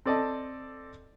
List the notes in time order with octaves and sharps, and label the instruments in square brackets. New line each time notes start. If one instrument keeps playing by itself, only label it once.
[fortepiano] C4 A4 D5 D#5 A5